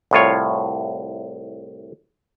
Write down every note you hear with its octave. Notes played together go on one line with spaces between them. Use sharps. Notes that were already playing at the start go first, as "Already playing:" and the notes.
C2 A2 F4 C#5